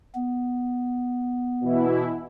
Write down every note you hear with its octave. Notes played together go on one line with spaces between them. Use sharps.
B3
B2 E3 E4